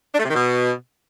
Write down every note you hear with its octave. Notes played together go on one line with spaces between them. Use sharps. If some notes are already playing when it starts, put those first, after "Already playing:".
D4
A3
C3
D#3
B2